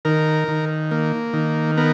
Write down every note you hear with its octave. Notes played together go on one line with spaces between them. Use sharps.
D#3 A#4
D#3
A#3
D#3
B3 A#4